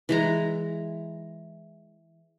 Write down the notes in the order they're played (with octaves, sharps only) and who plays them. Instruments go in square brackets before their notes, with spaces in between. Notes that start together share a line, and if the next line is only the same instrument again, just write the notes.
[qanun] E3 G#3 A#5